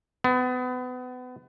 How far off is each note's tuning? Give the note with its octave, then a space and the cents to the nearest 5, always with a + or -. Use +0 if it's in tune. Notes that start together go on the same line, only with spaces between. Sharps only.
B3 +30